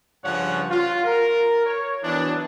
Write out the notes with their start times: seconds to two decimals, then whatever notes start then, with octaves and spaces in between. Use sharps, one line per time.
0.24 G2 C#3 F3 C#4 C#5 F#5
0.70 F4
1.05 A#4
1.66 C#5
2.04 E3 F#3 B3 D4